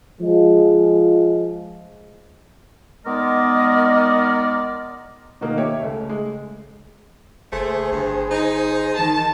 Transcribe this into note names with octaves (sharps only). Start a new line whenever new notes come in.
F3 G#3
D#3 G#3 B3 A#4 D5 D#5
B2 D#3 A#3
G4 C#5 E5
C#2 A3
G#3
F#1 A3 G#4 C5
G1 G2
D#4
D#3 A5